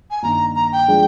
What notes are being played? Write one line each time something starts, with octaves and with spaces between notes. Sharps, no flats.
G#5
G2 D#3 A#3 A#5
A#5
G5
F3 G#3 D4 G#4